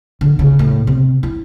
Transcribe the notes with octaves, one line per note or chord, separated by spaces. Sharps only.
D3
C#3
A2
C3
E4